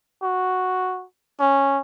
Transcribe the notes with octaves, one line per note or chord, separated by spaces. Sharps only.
F#4
C#4